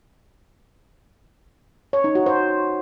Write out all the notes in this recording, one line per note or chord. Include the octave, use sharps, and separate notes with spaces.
C#5
D#4
F#4
C5